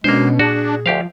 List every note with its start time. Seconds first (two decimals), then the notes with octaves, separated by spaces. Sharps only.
0.04 B2 G#3 A#3 C#4 D4 C5
0.39 A#2 D4 F#4 G#4
0.86 D2 F3 G4 F5